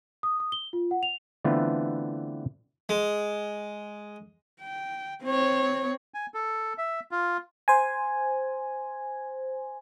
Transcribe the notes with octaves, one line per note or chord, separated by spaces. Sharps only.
D#6
D#6
G7
F4
F#5
F7
D3 E3 A3 B3 C4 F4
G#3
G5
C4 C#5
G#5
A4
E5
F4
C5 G#5